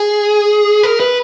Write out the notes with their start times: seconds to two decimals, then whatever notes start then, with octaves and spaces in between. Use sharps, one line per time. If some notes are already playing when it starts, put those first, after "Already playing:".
Already playing: G#4
0.83 A#4
1.00 B4